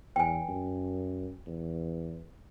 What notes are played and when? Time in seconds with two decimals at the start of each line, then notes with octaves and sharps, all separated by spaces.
0.16 E2 G5 G#5
0.49 F#2
1.47 E2